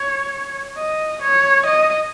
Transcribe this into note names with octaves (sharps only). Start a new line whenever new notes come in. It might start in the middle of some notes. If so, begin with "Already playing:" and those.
Already playing: C#5
D#5
C#5
D#5